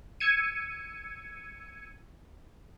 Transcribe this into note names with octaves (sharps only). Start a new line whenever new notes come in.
E6 G#6 C#7 D#7